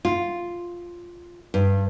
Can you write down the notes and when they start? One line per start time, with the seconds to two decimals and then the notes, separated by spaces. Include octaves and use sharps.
0.05 F4
1.54 G2